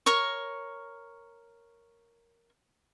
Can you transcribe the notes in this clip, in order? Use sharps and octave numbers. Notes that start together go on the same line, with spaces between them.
A#4 C#5 C#6